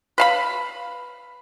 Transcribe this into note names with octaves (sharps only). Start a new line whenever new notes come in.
B4 F5 B5